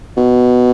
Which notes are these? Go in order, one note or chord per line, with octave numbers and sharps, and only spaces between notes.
B2